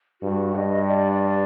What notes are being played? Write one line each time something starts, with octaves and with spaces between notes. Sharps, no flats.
G2 F#4
G2 D#5
D5
D5